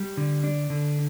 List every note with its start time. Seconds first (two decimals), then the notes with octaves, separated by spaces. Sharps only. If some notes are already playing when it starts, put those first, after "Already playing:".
Already playing: G3
0.17 D3
0.44 D4
0.70 D3